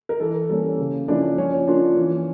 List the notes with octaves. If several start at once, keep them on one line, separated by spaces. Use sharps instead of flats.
A#4
E3 A4
G3 A#3 C#4 A4
C#3
F3 A#3 C#4 D4 E4 D5
F3 C#4 C#5
A#3 D4 F4
E3